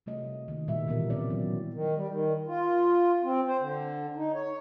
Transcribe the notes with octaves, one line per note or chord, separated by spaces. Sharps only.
C3 G3 A3 D#5
D#3 A#3
A#2 G3 A#3 E5
B2 E3 G3 B3 A#4
C#3 E3 C4 D5
F#3
D#3
G3
D#3
F4
C4
C5
D3
D#4
C#5